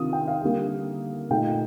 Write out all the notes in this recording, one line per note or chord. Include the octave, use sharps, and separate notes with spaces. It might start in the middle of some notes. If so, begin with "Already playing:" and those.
Already playing: C3 D#3 D4 F4 D#6
G5
F5
D3 G3 A#3
A#2 A3 D#4 G5